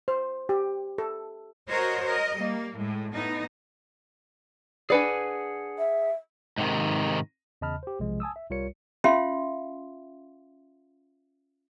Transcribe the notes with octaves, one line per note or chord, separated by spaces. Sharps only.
C5
G4
A4
F#4 A#4 C5 C#5 D#5
A#4 D#5
G3 A#3
A2 G#3
A2 B3 D#4
D4 G#4 B4 D5 F#5 G#5
E5
G#2 C3 D#3
E2 C#3 D#5 A5 B5 F6
G4 C5
B1 C3 F3 G#3
G#5 A5 D#6 E6
E5
C2 G3 F4 A#4 C#5 C#7
C#4 F4 E5 F5 G5 C6